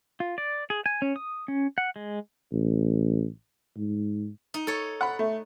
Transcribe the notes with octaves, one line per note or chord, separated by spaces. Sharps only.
F4
D5
G#4
G#5
C#4
D#6
C#4
F#5
G#3
A1
G#2
D#4
A4 C#5
F#5 B5
A3